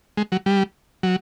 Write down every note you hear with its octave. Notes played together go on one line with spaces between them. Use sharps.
G#3
F#3
G3
F#3